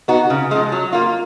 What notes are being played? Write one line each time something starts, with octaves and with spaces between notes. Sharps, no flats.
B3 D#4 F#4
C#3
F3 G#3
F#3
A#3 F4